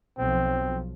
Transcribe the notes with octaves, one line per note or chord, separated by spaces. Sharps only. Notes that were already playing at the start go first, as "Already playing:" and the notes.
B1 F3 C4